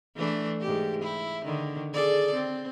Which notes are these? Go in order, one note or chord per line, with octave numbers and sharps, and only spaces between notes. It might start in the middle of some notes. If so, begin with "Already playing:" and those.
E3 A3 D4
G#2 G4
E4
D3 D#3
G#4 A4 D5
C4